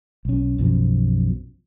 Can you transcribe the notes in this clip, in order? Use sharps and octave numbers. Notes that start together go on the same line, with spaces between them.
B1 C#4
B1 F#2 B2 F3